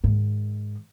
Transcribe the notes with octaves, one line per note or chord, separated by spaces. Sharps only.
G#2 D#3